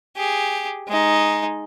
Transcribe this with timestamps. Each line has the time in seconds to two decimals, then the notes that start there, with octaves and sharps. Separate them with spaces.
0.16 G4 G#4
0.88 G#3 D#4